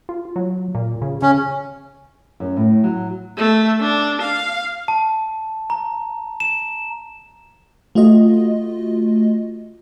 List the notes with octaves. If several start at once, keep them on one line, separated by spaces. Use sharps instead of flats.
F4
F#3
A#2
C#3
C#3 C#4
F#2
A2
F#3
A3
D4
F5
A5
A#5
E7
A3 F4 F#4 D#5